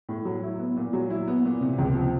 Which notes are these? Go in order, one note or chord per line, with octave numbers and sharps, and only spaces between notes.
A2
F#3
E4
B3
A#2
F#3
E4
B3
A#2
C3
C#2
F3